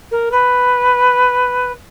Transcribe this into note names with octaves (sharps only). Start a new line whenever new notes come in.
A#4
B4